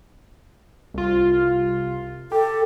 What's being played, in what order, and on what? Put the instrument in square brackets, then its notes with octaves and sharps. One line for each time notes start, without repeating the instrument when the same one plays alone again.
[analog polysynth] C2 F4
[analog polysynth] G4 [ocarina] A4